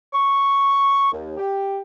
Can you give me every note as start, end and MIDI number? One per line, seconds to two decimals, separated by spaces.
0.13 1.12 85
1.12 1.37 39
1.38 1.79 67